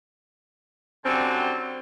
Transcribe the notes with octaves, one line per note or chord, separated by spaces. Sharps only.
D3 F#3 G3 C4 C#4